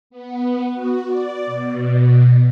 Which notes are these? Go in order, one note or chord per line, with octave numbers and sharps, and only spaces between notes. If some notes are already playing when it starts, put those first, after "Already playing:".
B3
F#4
D5
B2